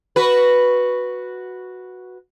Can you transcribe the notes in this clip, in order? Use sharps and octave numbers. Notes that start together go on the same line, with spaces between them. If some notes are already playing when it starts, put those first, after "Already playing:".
F#4 B4